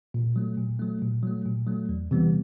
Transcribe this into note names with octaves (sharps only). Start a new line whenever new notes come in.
A#2
F#3 A3
A#2
F#3 A3
A#2
F#3 A3
A#2
F#3 A3
E2
C3 E3 G3 B3